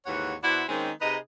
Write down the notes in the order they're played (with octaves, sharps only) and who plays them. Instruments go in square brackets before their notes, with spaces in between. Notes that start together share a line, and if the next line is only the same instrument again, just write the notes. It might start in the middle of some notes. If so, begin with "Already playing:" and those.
[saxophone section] D#2 G#2 E3 C#5 F#5
B2 E4 C5 D5 F#5
D#3 G#3 A#3 C4 C#4 D#4
C3 D#4 G#4 B4 D#5